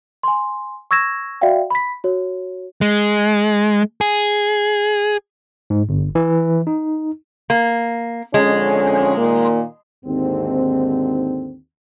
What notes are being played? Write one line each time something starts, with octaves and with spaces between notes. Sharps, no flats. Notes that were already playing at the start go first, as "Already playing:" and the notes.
G#5 C6
C#6 E6 G#6 A#6 E7
F#4 D5 E5 F5 G5
B5 B6
F#4 C#5
G#3
G#4
G#2
G1
E3
D#4
A#3
F2 D3 G#3 C#4
A#2 D#3 A#3
D#2 G#2 D3 C4